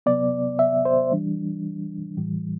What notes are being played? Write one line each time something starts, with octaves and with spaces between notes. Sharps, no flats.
C3 F#3 B3 D5
E5
C5
E3 G3 D4
A2 E3 G3